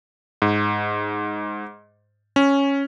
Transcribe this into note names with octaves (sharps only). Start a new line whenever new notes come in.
G#2
C#4